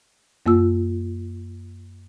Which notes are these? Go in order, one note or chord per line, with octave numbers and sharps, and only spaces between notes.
F#2 A#3 F4 E6